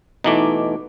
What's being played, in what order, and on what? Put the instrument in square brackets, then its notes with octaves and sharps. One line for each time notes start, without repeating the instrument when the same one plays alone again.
[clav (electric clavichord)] B2 E3 A3 [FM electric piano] D#4 D6